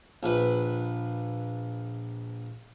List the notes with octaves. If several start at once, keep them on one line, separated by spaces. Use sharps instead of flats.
A#1 B4